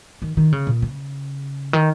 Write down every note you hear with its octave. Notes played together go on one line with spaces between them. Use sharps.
D#3
D#3
C#3
A#2
C#3
D#3